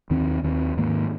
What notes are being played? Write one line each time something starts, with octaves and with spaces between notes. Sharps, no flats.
D#2 D#3 C4
D#2 D#3 C4
G#2 D#3 A#3